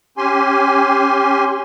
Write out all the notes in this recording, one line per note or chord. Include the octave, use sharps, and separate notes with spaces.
C#4 G4 G#5 C6